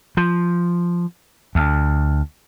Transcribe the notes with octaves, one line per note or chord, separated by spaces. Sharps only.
F3
D2